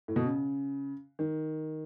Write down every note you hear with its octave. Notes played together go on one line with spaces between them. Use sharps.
A2
B2
C#3
D#3